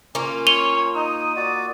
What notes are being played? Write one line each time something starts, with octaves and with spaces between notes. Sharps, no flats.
A#3 C#4 F4
C#5 D#7 F7 G7
D#4 D#6
F#4 D5